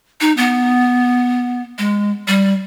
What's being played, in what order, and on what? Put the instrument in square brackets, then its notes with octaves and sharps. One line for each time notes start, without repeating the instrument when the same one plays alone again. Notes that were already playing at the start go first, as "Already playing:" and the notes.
[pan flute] D#4
B3
G#3
G3